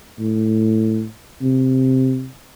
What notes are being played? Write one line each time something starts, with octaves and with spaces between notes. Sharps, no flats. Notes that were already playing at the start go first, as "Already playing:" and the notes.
A2
C3